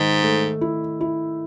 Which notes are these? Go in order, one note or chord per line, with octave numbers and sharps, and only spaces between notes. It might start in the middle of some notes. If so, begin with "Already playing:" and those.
Already playing: G#2 D#3
A3
E4
E4